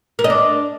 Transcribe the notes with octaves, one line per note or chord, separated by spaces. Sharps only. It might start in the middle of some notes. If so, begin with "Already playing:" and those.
A#4
D#5
D4